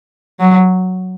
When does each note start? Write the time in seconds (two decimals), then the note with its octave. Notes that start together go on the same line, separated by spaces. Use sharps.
0.40 F#3